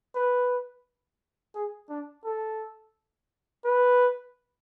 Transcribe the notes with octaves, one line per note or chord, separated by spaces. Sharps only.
B4
G#4
D4
A4
B4